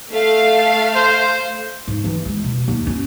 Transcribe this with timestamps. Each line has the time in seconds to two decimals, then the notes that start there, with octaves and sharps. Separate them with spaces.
0.11 A3 F5
0.95 C5
1.88 G#2
2.04 E3
2.25 G#3
2.44 B2
2.68 D#2
2.87 C#4